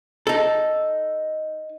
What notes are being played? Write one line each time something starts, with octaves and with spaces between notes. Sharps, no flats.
D#4 A4